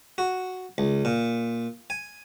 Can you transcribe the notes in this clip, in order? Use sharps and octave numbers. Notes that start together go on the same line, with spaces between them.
F#4
C#2
A#2
G#5